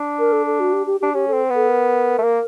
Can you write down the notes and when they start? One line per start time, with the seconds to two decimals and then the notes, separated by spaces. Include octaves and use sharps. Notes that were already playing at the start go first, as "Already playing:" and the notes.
Already playing: D4
0.19 A#4
0.32 A4
0.46 A4
0.60 F#4
0.73 G4
0.87 G4
1.00 D4 G4
1.14 C#4 G4
1.28 C4 A4
1.50 B3
1.55 A4
1.69 A#4
2.19 A3
2.23 A#3